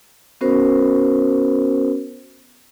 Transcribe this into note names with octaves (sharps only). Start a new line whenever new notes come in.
B3 C#4 F#4 A#4 C5